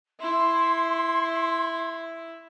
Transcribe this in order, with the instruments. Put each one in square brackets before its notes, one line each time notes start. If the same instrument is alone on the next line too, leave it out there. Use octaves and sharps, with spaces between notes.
[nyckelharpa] E4 [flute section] C6